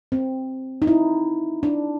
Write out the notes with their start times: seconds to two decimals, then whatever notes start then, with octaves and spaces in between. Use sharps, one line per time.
0.12 C4
0.82 D#4
0.87 E4
1.63 D4